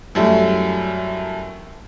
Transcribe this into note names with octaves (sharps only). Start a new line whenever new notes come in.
F#2 F#3 G3 A3 E4